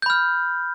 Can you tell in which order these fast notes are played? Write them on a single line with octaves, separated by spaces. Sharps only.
G6 B5 F6